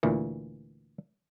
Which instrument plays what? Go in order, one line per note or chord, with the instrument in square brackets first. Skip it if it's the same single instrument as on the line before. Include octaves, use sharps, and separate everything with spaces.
[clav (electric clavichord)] D2 A#2 E3